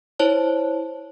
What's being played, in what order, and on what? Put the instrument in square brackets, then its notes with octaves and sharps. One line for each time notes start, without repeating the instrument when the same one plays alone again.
[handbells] E4 C5 C#5 A5